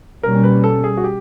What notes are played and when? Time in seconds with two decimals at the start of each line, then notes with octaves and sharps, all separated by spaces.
0.23 B2 G3 A#3 C#4 A#4
0.43 B4
0.64 A4
0.84 G#4
0.97 F#4
1.04 G4